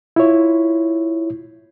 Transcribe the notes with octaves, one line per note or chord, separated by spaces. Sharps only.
E4 F4 C#5